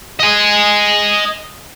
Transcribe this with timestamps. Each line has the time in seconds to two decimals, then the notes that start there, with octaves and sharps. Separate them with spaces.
0.20 D#5 G#5